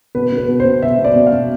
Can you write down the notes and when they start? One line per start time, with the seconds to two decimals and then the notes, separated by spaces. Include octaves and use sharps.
0.15 B2 B4
0.32 B2
0.38 B4
0.48 B2
0.60 C5
0.65 B2
0.82 B2 E5
0.98 B2
1.05 D5
1.16 B2
1.26 F5
1.32 B2